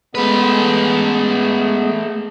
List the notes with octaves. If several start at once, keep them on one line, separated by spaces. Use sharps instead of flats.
G#3 A3 B3 G#4 B4